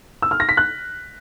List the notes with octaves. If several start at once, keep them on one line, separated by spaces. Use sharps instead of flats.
E6
F6
A#6
B6
F#6